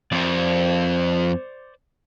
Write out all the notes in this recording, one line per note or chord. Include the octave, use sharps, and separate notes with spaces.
F2 C5 D5